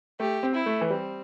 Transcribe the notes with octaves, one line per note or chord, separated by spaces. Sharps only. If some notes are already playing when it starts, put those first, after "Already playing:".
A3 G4
C4
E4
A3
E3
G3 C4